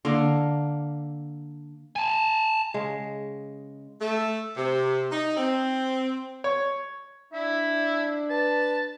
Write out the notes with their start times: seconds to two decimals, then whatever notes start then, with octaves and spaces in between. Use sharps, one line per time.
0.05 D3 A#3
1.96 G#5 A5
2.74 C#3 G#3
4.01 A3
4.56 C3
5.11 D#4
5.37 C4
6.44 C#5
7.33 D4 E4 E5
8.30 B4 A5